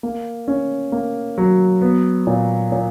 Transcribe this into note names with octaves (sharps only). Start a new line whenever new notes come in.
A#3
C#4
A#3
F#3
B3
A#2
A#2